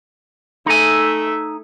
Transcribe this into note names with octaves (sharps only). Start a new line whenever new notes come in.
A3 D#4 E5 G#5